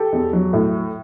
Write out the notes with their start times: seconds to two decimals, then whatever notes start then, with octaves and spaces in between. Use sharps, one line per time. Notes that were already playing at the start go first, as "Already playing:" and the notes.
Already playing: G4 A4
0.12 E2
0.33 F#3
0.53 A2